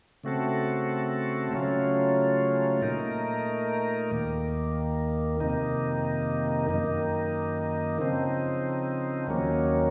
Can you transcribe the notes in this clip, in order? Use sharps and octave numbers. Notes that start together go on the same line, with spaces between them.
C#3 A3 C4 F#4 A4
C#3 F#3 A3 C#4 F4
A#2 A3 D#4 A#4
D#2 D#3 A#3
F2 C3 D#3 A#3 D#4
F#2 D#3 A#3 D#4
C#3 F3 C4 D#4
D#2 D#3 F#3 A#3 C#4